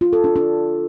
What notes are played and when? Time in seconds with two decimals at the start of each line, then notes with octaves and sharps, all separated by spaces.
0.01 F4
0.13 A4
0.24 D4
0.36 D4